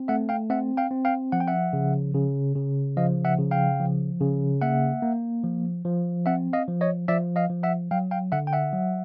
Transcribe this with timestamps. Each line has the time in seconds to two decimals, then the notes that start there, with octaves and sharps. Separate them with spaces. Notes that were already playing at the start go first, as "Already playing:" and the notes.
Already playing: C4
0.08 A3 E5 F#5
0.29 F5 G5
0.50 C4 E5 F#5
0.77 F5 G5
0.91 C4
1.05 F5 G5
1.32 F3 F#5
1.40 G5
1.48 E5 F#5
1.73 C#3
2.14 C#3
2.56 C#3
2.97 F3 D#5 F5
3.25 E5 F#5
3.39 C#3
3.51 F5 G5
3.80 F3
4.21 C#3
4.62 A#3 E5 F#5
5.02 A#3
5.44 F3
5.85 F3
6.26 C4 E5 F#5
6.53 D#5 F5
6.68 F3
6.81 C#5 D#5
7.08 F3 D5 E5
7.36 D#5 F5
7.50 F3
7.63 E5 F#5
7.91 F#3 F5 G5
8.11 F5 G5
8.32 D3 E5 F#5
8.47 G5
8.53 E5 F#5
8.73 F#3